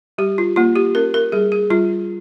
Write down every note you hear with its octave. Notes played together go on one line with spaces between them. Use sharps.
G3 G4
F4
A#3 F4
G4
C#4 A#4
A#4
G3 G#4
G#4
G3 F4